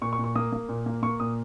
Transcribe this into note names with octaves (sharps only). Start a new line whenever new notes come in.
A#2 C#6
C#6
A#2
C#6
A#3 D#6
A#3
A#2
A#3
A#3 C#6
A#2 D#6